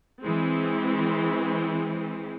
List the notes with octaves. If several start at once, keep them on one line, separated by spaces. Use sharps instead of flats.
E3 G#3 C4